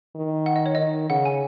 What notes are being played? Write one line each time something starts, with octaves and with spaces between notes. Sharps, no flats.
D#3
F#5
D#5
C#5
D#3 D#5
C#3 F#5
G#5